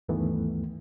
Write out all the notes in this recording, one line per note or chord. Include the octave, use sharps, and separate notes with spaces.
D2 G2 D#3 E3 A3 B3